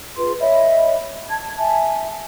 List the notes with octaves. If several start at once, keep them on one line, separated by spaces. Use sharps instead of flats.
F4 G#4 B4 C6
C#5 D#5 E5 B5
A5 G#6
E5 G#5 A5